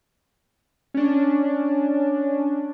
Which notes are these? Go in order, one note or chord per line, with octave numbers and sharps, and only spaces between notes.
C#4 D4